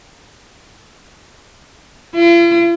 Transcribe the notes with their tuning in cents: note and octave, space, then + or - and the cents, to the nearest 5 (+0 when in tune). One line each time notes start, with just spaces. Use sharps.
F4 -45